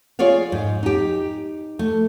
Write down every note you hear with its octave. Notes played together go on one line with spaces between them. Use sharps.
F4 G#4 C#5 D5 F5
G#2
D#4 G4
A3